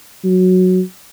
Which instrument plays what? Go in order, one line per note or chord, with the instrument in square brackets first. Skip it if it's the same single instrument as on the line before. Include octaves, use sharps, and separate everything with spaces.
[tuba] F#3